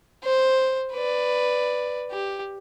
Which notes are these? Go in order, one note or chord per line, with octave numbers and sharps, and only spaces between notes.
C5
B4 D5
G4